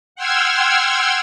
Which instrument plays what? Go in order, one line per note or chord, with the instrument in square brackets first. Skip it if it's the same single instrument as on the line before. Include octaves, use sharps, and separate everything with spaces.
[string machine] F#5 G5 C6 E6 F6 G#6